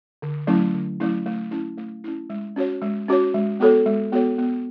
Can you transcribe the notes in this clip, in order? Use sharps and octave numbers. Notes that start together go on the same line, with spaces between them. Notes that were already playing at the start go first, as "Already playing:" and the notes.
D3
F#3 A3 C#4 E4
D3
F#3 A3 C#4 E4
A3
C#4 E4
A3
C#4 E4
G#3
C#4 F#4 C#5
G#3
C#4 F#4 C#5
G#3
B3 F#4 A4 C#5
G#3
B3 F#4 A4 C#5
B3